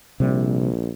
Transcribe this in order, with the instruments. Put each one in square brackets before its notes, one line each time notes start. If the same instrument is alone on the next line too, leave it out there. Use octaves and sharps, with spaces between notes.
[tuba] A#1 [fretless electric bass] C3 G3